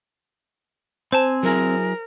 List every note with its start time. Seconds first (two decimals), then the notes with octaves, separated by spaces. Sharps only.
1.12 C4 C5 G#5 A5
1.43 F#3 E4 G#4 A#4